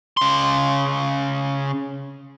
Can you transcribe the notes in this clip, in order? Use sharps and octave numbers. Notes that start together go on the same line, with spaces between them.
C#3 C6